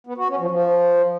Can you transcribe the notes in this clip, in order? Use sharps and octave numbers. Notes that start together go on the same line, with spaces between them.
B3
F#4
C#4
F3
F3